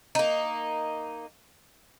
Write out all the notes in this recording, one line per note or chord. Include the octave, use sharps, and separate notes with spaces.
A#3 D#4